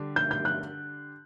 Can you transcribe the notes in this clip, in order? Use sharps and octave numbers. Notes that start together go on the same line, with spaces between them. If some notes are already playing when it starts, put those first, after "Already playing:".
Already playing: D3 G3 D4 G4
G6
G6
F#6